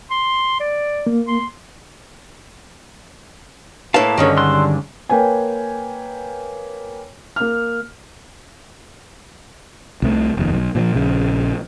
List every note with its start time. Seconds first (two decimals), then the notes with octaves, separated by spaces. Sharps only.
0.11 C6
0.60 D5
1.07 A#3
1.28 C6
3.94 A2 A#3 B4 F5 A5
4.18 G2 D3 D#3 G#3 C#4
4.37 C6 E6 F#6
5.09 A#3 B4 C#5 G5 G#5
7.36 A#3 F6
10.02 C2 C3 A3
10.37 F1 D#2
10.52 B1
10.75 A#2 E3 F3
10.94 A#1 C#3